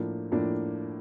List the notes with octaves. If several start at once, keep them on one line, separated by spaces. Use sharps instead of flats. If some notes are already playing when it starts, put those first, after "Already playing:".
Already playing: A2 F3 A#3 D4
A2 F3 A#3 D4